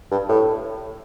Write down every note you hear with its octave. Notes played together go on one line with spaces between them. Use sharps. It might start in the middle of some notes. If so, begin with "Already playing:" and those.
G2
A2